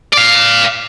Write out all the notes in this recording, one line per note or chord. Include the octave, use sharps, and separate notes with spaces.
D5 F5